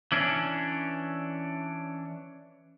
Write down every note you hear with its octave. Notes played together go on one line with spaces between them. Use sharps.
E3 C#4 D4